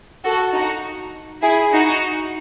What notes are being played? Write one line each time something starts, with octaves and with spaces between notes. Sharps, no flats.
F#4 A4
D#4 F#4
E4 G#4
D#4 F#4